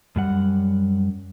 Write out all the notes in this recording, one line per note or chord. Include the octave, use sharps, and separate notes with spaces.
F#2 G3 F#5